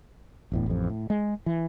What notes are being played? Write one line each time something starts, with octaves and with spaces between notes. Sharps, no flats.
D1 E2 A2
A1 F2
A2
G#3
E3